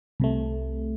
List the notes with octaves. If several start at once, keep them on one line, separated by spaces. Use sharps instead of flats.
C2 C3 A3